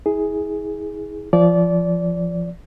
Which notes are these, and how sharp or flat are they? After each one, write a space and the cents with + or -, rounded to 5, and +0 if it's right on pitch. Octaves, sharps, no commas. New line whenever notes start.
E4 -40 G#4 +0
F3 -20 D5 -20